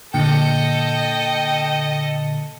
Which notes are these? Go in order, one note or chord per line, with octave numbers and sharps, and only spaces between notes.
A#2 D3 A4 D#5 G5 C#7